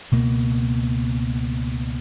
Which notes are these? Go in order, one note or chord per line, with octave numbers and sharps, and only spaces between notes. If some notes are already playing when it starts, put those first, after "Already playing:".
C#2 B2 A#3